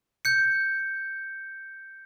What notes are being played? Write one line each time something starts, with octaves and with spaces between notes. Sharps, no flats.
G6 C#7